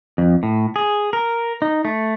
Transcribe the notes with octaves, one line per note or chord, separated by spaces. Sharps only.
F2
A2
G#4
A#4
D#4
A3